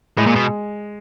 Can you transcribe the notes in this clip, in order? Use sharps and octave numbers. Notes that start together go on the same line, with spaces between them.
A2 G#3
A#2
B2